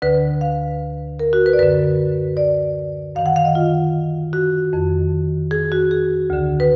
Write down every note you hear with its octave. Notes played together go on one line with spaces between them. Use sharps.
D2 D3 B4
F5
A#4
F#4
B4
D5
F#2 D3 B4
D5
F#2 D#3 F5
F#5
F5
D#5
F4
F#4
F2 D#3
G#4
F#4
G#4
D2 D3
B4